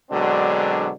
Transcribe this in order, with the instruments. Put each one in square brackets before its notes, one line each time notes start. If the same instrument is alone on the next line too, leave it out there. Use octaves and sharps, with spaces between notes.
[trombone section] B2 D3 F#3 G#3 C4 D4